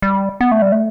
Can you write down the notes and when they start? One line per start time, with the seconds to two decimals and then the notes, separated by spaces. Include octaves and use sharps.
0.02 G3
0.41 B3
0.52 A3
0.62 G3
0.72 A3